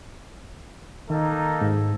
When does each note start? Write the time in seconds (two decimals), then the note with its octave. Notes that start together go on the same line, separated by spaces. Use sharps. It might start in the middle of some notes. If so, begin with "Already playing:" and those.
1.10 D#3 A#3 D#4 A4
1.61 G#2